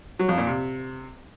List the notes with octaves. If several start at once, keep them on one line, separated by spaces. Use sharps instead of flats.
F#3
F2
A#2
C3